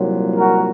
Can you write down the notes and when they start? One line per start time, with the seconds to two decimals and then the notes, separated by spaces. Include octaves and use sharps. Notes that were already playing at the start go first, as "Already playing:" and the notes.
Already playing: C2 A#2 F#3
0.37 F#4 A#4